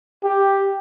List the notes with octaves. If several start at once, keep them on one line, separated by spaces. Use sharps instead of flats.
G4